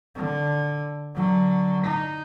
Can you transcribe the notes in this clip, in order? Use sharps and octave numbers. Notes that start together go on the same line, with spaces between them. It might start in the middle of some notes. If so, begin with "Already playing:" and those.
D3
D3 F#3
D#4